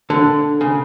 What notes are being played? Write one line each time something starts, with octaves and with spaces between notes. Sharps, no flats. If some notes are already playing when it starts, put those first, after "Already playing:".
D3
C#3